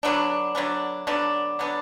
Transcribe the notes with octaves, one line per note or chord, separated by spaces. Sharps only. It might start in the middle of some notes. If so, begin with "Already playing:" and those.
D3 F#3 B3 D4
D3 F#3 B3 D4
D3 F#3 B3 D4
D3 F#3 B3 D4